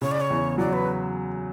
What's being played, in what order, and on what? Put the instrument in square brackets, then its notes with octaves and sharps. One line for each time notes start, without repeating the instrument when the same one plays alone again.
[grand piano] C#3 [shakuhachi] C#5
[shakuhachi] D5
C#5
[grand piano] E2
[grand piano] F#3 [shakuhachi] D5
[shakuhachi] B4